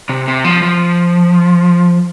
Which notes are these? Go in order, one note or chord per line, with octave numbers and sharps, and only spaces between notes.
C3
C3
F3
F3